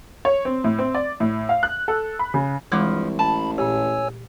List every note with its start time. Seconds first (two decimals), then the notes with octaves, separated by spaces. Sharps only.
0.25 C#5
0.45 C4
0.64 A2
0.79 C4
0.95 D5
1.20 A2
1.49 F5
1.63 F#6
1.88 A4
2.19 B5
2.34 C#3
2.72 C2 G2 E3 F3 G#3 D6
3.19 A1 A5 B5
3.58 A#2 G4 C#5 G#5 E6